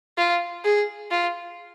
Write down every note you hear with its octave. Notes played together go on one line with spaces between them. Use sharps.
F4
G#4
F4